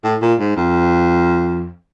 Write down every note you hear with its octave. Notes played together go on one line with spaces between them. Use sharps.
A2
A#2
G#2
F2